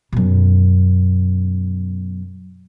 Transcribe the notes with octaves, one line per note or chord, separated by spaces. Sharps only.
F#2 B2